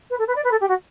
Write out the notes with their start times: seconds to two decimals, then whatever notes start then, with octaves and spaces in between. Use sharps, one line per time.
0.10 B4
0.18 A4
0.27 B4
0.35 D5
0.44 B4
0.51 A4
0.60 G4
0.68 F#4